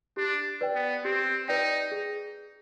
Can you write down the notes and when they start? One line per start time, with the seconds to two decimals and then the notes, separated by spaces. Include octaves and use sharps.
0.17 D4 G4
0.61 B4 D5 G5
0.75 B3
1.05 C4 G4
1.48 D#4 B4 D5 G5
1.92 G#4